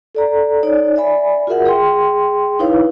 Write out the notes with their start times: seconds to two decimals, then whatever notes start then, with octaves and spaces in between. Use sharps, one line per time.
0.15 A4 D5 A#5
0.63 D#4 C#5 D5
0.96 D5 E5 G#5 B5
1.47 F4 F#4 G#4 A#4 E5 F#5
1.65 G#4 G5 C6
2.59 D#4 E4 B4 C#5 F5